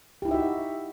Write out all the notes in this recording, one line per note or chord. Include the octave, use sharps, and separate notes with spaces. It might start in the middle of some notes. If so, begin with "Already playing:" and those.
D#4 E4 F#4 G4 E5